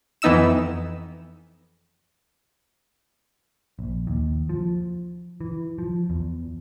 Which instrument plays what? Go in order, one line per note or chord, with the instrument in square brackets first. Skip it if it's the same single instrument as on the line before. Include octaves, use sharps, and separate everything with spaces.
[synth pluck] F2 E3 B3 D#4 E6 E7
[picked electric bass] A#1
D#2
F3
E3
F3
E2